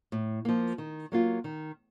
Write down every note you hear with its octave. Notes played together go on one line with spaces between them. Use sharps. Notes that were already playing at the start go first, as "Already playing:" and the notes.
A2
F3 A#3
D#3
F#3 A#3 F4
D#3